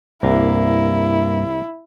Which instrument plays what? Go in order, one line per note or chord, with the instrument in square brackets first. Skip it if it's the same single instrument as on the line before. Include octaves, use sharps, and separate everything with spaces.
[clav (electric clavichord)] C2 [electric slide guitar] G2 A#3 [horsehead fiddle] E4